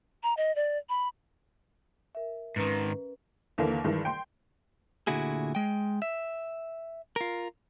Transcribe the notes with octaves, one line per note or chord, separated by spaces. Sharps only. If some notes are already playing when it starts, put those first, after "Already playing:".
A#5
D#5
D5
B5
A#4 E5
G#2 D#3 C#4 B4 A#5
D#2 D3 E3 A#3
G2 D#3 E3 G#3
G5 C6
D2 A#2 D3 E4 F#4 G#4
G#3 G5
E5
F4 A#4